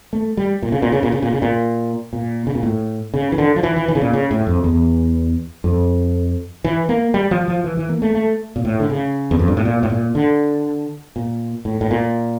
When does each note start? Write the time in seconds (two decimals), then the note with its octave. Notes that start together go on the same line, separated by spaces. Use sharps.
0.13 A3
0.37 G3
0.63 A#2
0.72 C#3
0.82 A#2
0.92 C#3
1.03 A#2
1.12 C#3
1.22 A#2
1.33 C#3
1.42 A#2
2.13 A#2
2.47 C#3
2.55 A#2
2.63 A2
3.14 C#3
3.32 E3
3.38 D3
3.56 F3
3.63 E3
3.76 E3
3.88 E3
3.95 C#3
4.01 A#2
4.13 C#3
4.31 A2
4.47 F2
4.64 E2
5.64 F2
6.64 E3
6.89 A#3
7.14 G3
7.31 F3
7.48 F3
7.64 E3
7.77 E3
7.89 A#3
8.02 A3
8.14 A3
8.56 A#2
8.65 A2
8.80 D3
8.90 C#3
9.31 E2
9.39 F2
9.48 G2
9.57 A2
9.65 A#2
9.83 A2
9.90 A#2
10.15 D3
11.16 A#2
11.65 A2
11.81 A2
11.91 A#2